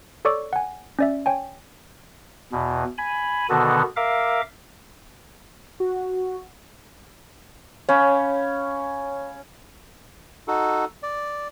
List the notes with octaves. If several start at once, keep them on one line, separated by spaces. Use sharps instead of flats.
A4 C#5 D5 C#6 D6 E6
F#5 G#5
C#4 D5 E5
C#5 G5 G#5
E2 B2
G#5 B5
B2 D3 D#3 B3 F#4 A4
A#4 E5 F5 D6
F#4
C#4 C#5 F5 B5
D#4 F#4 A4
D5